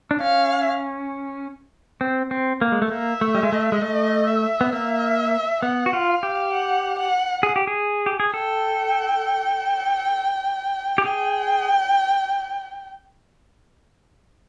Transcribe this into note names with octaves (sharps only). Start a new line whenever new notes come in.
D4
C#4 F5
C4
C4
A#3
G#3
A3
A#3 E5
A3
G3
G#3
A3
G#3
A3 D#5
E5
B3
A#3 E5
B3 F#5
F#4
F4
F5
G4
F#5
F#5
G#4
G4
G#4
G4
G#4
A4 G5
G4
G#4 G5